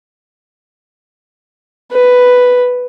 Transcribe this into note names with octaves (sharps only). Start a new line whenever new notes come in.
B4